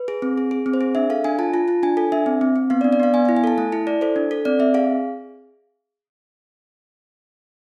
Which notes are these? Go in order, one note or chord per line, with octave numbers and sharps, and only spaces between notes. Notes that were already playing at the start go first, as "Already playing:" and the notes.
Already playing: B4
G#4
C4
G#4
G#4
C4
C5
G#4
D4 E5
A4 F5
D4 G#5
F4 A5
F4 A5
F4 A5
D4 G#5
A4 G#5
D4 E5
C4
C4
C4
B3 F5
D5
D4
D5
B3 F5
B3 G#5
F5
E4
G#5
A4 A5
A3 A5
E4 A5
E4 D5
A4 C5
D4
A4
C4 D5
C4 E5
G#4 F5